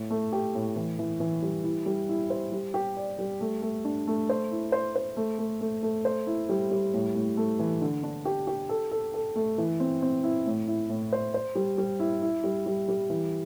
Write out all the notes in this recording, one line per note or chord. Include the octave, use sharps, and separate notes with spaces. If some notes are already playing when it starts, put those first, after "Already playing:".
Already playing: A2
A3
G4
A2
E3
E3
E3
G3
E4
G3
E4
C5
G3
G4
D5
G3
A3
A3
D4
A3
C5
E4
C5
C5
A3
A3
A3
A3
C5
E4
G3
G3
A2
A2
A3
E3
D3
D4
G4
G4
A4
A4
A4
A3
E3
C4
C4
E4
A2
E4
A2
C5
C5
G3
G3
E4
E4
G3
G3
G3
E3